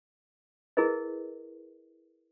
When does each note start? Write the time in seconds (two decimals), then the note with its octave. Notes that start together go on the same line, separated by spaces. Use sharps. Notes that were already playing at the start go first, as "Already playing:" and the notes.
0.77 E4 G#4 A#4 B4 D#5